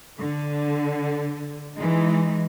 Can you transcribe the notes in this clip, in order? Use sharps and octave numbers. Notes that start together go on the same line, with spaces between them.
D3
E3 G#3 D#4